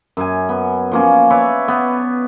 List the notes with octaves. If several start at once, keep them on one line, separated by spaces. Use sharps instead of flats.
F#2 G#5
B3
F3 A#3 C#4
B4 C#5 D5 E5
B3